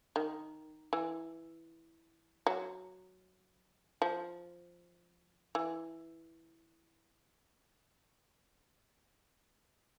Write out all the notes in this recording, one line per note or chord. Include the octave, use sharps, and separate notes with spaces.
D#3
E3
F#3
F3
E3